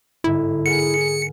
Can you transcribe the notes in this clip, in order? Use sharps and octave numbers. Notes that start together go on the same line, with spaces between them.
G1 G#2 D3 E4
G#4 A#4 F#5 C#7